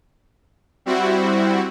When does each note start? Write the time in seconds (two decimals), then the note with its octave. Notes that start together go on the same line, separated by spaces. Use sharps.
0.86 G3 C4 E4 F#4